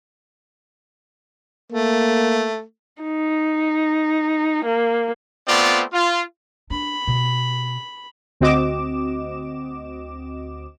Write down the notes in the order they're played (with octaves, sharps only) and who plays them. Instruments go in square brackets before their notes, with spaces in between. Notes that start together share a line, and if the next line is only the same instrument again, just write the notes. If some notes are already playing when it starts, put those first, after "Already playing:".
[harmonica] A3 [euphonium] A#3
[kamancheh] D#4
A#3
[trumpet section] A3 B3 C4 F4 D5
F4
[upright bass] D4 [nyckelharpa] B5
[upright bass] B2
[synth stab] D2 C4 F#4 D#5 D6 E7